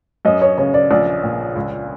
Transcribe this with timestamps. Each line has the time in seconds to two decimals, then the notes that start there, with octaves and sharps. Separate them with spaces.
0.25 F#2 D#5
0.42 C#5
0.58 C#3 C#5
0.74 D5
0.91 A#1 D5
1.24 A#2
1.56 C#2